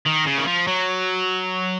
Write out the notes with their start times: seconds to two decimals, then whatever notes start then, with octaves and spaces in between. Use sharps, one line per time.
0.06 D#3
0.27 C#3
0.38 D#3
0.47 F3
0.67 F#3